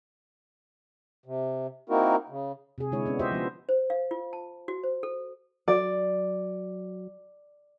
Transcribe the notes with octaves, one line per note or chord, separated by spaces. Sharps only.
C3
A#3 C4 D#4 E4 F#4 A#4
C#3
C3 G#4
D3 G#3 E4 C#5
B3 C#4 D4
F4 G4 C5 D#5 E5
F3 B3
C5
F5
F4
A5
F#4
C5
A4
F#3 D5